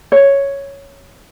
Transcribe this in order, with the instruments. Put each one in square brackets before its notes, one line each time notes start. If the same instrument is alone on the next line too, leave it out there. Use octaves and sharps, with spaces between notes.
[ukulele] C#5